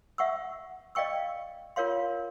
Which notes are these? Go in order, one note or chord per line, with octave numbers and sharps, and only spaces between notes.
E5 F#5 C#6 E6
D5 D#5 F5 G5 C#6 E6
F4 A#4 C#5 F5 C6